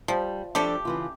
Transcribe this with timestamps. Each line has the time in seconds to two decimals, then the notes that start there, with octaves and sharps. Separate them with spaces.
0.08 F3 G3
0.55 F3 G3 A3 D4 G4 A4
0.85 C#3 E3 F4